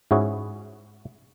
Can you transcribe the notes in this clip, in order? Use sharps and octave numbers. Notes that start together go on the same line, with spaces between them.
G#2 C#4 E4 F#4 G#4